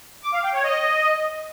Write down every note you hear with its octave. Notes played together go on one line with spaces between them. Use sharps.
D6
F5
G5
C#5
D#5